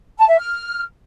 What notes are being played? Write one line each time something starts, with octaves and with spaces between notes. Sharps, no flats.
A5
E5
F6